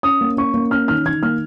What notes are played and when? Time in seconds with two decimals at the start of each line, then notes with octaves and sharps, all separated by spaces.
0.03 C#4 D#6
0.21 A#3
0.37 C#4 C#6
0.54 A#3
0.71 C#4 F6
0.88 D#3 F6
1.05 D#3 G#6
1.23 A#3 F6